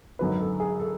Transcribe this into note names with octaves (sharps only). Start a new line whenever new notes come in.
G#1 F#2 D3 F#3 B4
A4
G#4
A4